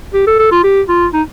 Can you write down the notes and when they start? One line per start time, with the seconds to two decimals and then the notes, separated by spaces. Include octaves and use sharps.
0.14 G4
0.27 A4
0.39 A4
0.51 F4
0.64 G4
0.89 F4
1.13 D#4